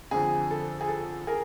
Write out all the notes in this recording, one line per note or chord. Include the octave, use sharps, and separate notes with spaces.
F2 D3 G#4
A4
G#4
A4
G#4 A#4